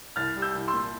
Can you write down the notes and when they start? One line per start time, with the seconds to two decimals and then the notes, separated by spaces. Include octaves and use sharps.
0.16 C2 F6 A6
0.36 G3
0.42 E6 G6
0.55 C2
0.68 C6 E6
0.73 A#2